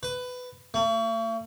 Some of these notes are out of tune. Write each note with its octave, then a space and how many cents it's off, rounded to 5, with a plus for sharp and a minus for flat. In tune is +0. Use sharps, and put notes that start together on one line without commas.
B4 +15
A3 +45